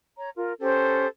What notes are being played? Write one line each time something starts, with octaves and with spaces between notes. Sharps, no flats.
C#5 A#5
F4 A#4
C#4 G4 A4 C5